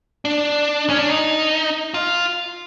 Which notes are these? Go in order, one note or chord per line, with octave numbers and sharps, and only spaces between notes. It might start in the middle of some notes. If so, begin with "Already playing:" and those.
D4
C#4
D4
D#4
F4